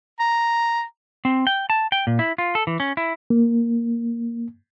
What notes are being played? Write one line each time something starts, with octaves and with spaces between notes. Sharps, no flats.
A#5
C4
G5
A5
G5
A#2
E4
F4
A4
E3
C#4
E4
A#3